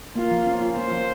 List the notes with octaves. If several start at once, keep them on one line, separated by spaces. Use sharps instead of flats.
A#3 F4
F3
C#4
F4
A#3 C5
F3